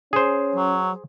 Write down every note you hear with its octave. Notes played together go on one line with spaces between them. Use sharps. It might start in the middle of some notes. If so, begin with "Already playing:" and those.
C#4 G#4 C5
F#3